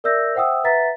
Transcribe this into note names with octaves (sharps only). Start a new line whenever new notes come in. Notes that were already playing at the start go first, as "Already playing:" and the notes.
A#4 D5 E5 E6 G6 A#6
C5 E5 F#5 G5 D#6 E6
B4 E5 F#5 A#5 A6 B6